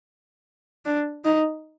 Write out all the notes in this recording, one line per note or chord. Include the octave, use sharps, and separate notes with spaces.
D4
D#4